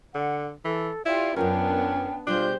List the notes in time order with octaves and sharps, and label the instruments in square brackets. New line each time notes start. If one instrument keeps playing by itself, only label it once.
[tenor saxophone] D3 [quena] F#5
[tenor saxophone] E3 [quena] A4
[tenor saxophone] E4 [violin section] F4 G4 [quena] D5
[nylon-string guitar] F#2 F4 A#4 [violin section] B3 D4 [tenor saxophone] C#4 [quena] G5
[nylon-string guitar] B2 G3 G#3 [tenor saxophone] D4 [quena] F4 [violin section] G4 C5 G6